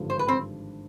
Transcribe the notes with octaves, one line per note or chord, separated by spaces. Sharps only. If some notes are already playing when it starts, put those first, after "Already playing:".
Already playing: G#1 G2 D3 F3
C5
B4
C4 C5